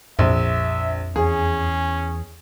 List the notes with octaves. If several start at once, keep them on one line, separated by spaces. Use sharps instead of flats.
A#1 F2 E5
E2 C#4 G#4